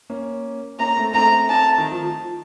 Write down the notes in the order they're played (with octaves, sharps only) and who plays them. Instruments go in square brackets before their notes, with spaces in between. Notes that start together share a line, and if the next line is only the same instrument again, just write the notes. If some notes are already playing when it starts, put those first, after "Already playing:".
[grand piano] A#3 C#4
[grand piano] A#3 C#4 [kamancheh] A#5
[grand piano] A3 C4
[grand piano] A3 C4 [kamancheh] A#5
[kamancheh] A5
[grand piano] D#3
F3